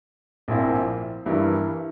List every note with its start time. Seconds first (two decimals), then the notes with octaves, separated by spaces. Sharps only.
0.48 A#1 A#2 F3 C4 E4
1.26 G2 E3 A#3 E4